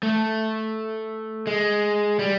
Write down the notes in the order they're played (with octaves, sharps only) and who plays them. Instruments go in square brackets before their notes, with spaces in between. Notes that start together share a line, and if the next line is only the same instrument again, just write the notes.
[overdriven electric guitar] A3
G#3
G3